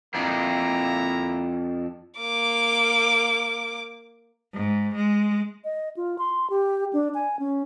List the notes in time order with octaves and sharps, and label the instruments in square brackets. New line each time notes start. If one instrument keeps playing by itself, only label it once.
[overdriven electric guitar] F2 D4 [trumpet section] A#3 E4 A#5
[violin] A#3 D6
[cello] G#2
G#3
[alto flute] D#5
F4
C6
G4
D4
G#5
C#4